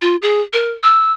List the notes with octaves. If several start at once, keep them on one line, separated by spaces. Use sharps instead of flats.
F4
G#4
A#4
E6